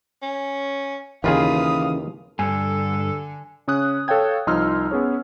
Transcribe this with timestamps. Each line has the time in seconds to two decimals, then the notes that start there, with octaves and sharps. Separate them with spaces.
0.22 C#4
1.24 D#2 C#3 E3 F4 G#4 B4 F5 D#6
2.39 G2 D3 A4 G#5
3.68 C#3 C#4 D#6 F#6
4.08 A4 C#5 F5 G5 G#6
4.47 C2 F3 D#4 C6 E6 F6
4.91 B3 C#4 G#4 C#5